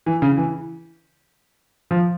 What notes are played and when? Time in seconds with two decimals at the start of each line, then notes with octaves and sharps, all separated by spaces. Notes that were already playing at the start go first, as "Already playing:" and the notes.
0.06 E3
0.22 C#3
0.37 E3
1.91 F3